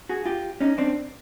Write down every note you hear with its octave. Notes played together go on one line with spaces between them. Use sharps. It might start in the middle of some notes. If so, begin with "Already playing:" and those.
F#4 G#4
F4 G4
C#4 D#4
C4 D4